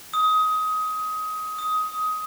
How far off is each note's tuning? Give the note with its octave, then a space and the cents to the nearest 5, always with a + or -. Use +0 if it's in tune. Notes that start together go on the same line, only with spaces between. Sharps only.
D#6 +20
D#6 +15